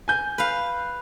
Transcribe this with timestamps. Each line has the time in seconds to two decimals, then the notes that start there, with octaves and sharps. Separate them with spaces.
0.08 G#5 G6
0.38 B4 F5